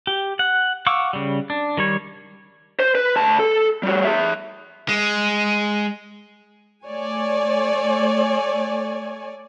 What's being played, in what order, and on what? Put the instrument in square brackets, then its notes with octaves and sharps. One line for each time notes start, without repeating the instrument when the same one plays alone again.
[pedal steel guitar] G4
F#5
F5 F#5 C#6 D6 E6
C#3 G3
D4
D#3 G3 C#5
[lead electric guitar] C5
B4
D2 A5
A4
G3 F#4
G#4 E5
[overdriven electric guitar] G#3
[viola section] A3 C#5 D5 G#5